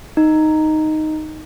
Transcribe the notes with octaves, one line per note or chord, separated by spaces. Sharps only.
D#4